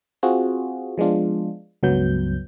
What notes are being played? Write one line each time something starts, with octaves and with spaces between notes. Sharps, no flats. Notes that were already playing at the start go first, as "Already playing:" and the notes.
C4 F4 F#4 G#4
F3 G#3 B3 D4 F4
C#2 G2 F#3 B3 G6